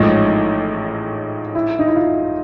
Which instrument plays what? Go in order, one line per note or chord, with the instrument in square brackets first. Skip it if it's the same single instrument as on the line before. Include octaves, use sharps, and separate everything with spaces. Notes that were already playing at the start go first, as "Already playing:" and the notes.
Already playing: [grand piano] A1 G#2 F3 A3 [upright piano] D#4
[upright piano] E4
D#4
E4
F4